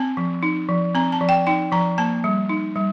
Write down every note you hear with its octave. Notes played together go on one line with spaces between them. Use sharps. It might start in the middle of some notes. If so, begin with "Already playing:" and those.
Already playing: C4 A5
F3
D#4
F3
C4 A#5
A5
F3
G5
D#4 G5
F3 A#5
A#3 A5
G3
D#4
G3